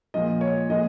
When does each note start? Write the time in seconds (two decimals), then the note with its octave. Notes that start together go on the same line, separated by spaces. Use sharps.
0.14 A#2 F3 G#3 D#5
0.41 C#5
0.70 A#2 F3 G#3 D#5